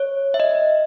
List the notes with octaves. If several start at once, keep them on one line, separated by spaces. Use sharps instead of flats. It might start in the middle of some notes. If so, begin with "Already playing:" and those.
Already playing: C#5
E5
D#5